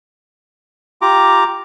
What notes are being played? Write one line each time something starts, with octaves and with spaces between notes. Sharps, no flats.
F4 G4 A#5 D6